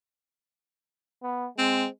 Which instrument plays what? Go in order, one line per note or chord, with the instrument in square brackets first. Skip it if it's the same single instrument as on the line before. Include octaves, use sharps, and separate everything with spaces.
[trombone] B3
[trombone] G#3 [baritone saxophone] C4